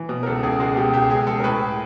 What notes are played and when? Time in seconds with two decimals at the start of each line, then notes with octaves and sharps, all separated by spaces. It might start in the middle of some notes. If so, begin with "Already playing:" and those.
Already playing: E3
0.09 B2
0.23 A#4
0.26 C#2 A4
0.43 C#2 G#4
0.59 G#3 F#4
0.76 B2 G4
0.93 C#2 G4
1.10 C#2 G#4
1.27 G#3 A4
1.40 A#4
1.44 A2 B4